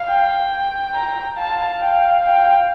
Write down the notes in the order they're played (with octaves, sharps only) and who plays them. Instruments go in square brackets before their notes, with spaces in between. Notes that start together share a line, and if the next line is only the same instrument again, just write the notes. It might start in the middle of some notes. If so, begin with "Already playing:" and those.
Already playing: [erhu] F5
[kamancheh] G5
[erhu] A#5
[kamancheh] F5 [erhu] A5
[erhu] G5
G5